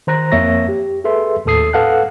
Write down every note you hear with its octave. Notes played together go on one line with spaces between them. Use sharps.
D#3 C5 A#5 F#6 A#6
F2 A#3 C#5 E5 C#6 A#6
G4
G#4 A4 B4 E5 C6
D#2 A2 A4 D#6 C7
A4 B4 F5 F#5 A5 F#6